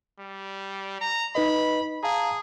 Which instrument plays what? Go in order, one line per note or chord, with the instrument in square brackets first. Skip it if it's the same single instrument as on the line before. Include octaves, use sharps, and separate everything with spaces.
[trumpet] G3
A#5
[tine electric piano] D#4 B4 D#5 [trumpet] B5
[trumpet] G#4 [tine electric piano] F5 A5 A#5